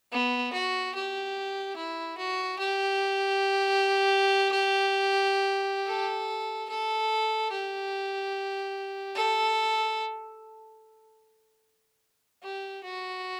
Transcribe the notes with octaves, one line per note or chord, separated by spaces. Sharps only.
B3
F#4
G4
E4
F#4
G4
A4
A4
G4
A4
G4
F#4